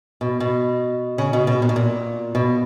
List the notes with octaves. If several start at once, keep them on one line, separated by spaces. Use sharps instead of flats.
B2
B2
C#3
B2
B2
A#2
B2
A#2
B2